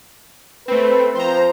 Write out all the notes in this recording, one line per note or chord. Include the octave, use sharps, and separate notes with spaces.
A3 C4 B4
F3 C4 C5 A#5